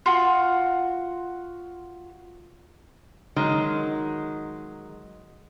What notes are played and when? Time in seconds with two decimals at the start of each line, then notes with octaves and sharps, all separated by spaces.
0.06 F4 F#4
3.36 D#3 F#3 G#3